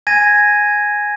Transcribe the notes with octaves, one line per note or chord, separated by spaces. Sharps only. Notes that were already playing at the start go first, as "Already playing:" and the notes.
G#5 G#6 A#6 D#7